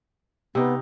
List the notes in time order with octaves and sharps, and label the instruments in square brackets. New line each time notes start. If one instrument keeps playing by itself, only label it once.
[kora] C3 D#4 [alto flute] B3